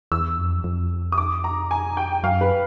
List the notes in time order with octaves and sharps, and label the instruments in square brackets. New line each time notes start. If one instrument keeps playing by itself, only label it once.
[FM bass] E2 [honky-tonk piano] E6
[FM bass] F2
F2
[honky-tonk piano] D#6
D6
A#5
G#5
G5
[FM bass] F#2 [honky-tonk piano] F5
[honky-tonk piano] B4